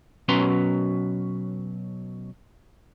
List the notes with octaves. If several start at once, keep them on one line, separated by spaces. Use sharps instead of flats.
B2 F#3 C#4 B4 A#5 C6